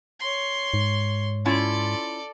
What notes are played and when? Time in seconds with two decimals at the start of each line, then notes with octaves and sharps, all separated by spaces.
0.20 C#5 C6
0.74 G#2
1.45 C#4 E4 F4 A4 D5